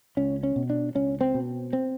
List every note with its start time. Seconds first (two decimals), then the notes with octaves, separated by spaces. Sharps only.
0.17 C#2 C#4
0.43 C#4
0.56 B2
0.70 D4
0.95 C#2 C#4
1.21 C4
1.34 B2
1.73 C4